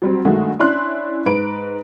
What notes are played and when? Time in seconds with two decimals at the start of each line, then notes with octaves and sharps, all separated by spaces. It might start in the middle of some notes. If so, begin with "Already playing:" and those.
0.02 F#3 G3 C4
0.25 G2 D#3 G#3 A3 F#4
0.59 C#4 D4 E4 C6 F#6
1.26 G#2 B4 D7